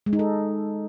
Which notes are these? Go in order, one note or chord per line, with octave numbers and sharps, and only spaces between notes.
G#3
D#4
A4